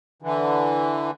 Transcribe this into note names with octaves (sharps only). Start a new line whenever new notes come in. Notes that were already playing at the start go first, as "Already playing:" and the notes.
D3 E3